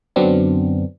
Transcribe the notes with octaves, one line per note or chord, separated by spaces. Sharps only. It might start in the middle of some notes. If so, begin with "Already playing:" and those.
F#2 D3 F#3 B3 C4 D4